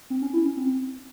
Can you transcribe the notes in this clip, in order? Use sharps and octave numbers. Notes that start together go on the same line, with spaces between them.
C4
C#4
E4
C#4
C4